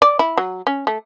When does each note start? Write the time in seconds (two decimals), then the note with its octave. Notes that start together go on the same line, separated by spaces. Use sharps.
0.02 D5
0.19 E4
0.37 F#3
0.67 C#4
0.87 A3